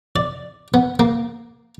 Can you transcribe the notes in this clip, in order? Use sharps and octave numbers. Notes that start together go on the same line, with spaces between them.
D5
B3
A#3